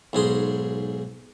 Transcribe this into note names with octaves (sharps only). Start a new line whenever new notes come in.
B1 G#2 G#4 C6